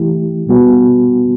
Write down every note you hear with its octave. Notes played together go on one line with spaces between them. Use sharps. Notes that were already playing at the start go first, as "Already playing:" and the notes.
Already playing: E3 A3 E4 G4
B2 G3 B3 F#4